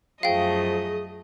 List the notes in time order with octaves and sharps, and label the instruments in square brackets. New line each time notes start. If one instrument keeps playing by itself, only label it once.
[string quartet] F#2 A3 D#5 [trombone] F3 [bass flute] G#4 [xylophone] F5 G5